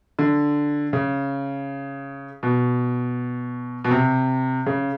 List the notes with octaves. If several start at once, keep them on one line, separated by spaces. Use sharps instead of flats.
D3
C#3
B2
B2
C3
C#3